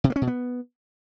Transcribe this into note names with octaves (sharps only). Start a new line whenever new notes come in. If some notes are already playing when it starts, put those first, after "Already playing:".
C3
A#3
C#4
B2
B3